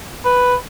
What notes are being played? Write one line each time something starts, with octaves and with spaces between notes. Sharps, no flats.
B4